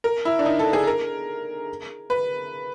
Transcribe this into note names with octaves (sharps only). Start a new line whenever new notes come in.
A#4
E4
D4
D#4
A4
G#4
A#4
B4